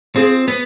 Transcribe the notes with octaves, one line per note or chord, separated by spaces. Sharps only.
C4 F4 G#4 C5
B3